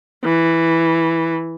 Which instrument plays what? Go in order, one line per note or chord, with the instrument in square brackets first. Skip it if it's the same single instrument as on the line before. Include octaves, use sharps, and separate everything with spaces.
[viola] E3